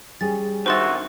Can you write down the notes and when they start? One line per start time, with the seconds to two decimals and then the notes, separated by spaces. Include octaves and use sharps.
0.21 G3 C#4 G#4 A6
0.66 G2 D#3 F#4 C5 E5 C6 A6